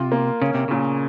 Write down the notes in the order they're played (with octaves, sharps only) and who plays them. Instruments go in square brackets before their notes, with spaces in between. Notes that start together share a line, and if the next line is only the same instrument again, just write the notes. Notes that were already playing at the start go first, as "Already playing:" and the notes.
Already playing: [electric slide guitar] C3 [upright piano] F4
[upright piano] A#3
[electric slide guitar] C#3 [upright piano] C#4
[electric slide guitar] C3
[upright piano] A#2 [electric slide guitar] C#3